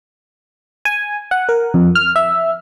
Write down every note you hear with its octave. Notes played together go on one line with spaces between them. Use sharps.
G#5
F#5
A#4
F2
F6
E5